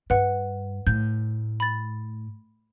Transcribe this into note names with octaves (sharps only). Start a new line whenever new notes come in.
G2 B4 F#5
A2 G6
B5 A6